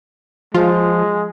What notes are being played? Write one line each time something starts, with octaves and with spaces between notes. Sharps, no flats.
F3 G#3 F4